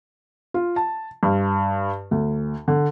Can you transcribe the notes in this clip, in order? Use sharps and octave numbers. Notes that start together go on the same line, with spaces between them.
F4
A5
G2
D2
D3